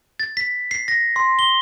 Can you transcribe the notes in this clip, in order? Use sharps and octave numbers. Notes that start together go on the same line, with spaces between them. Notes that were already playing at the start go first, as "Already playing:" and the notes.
A6
B6
C7
A#6
C6
G7